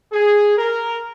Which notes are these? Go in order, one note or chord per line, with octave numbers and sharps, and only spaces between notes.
G#4
A#4